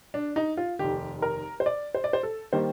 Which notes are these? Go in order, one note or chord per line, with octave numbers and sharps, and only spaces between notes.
D4
D#4
F4
F1 D#2 D#3 G4
A#4
C5
D5
C5
D5
C5
A4
D#3 G3 A#3 C5